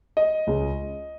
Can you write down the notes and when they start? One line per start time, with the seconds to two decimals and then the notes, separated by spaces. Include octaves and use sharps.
0.17 D#5
0.47 C#2 C#3 G#3